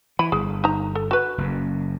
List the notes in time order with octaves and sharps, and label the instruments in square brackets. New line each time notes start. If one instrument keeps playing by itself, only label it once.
[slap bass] E3 [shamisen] B5
[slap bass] G1 [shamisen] G#4
[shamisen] D#4 A#5
A4
F#4 B4
[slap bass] F#1 F#2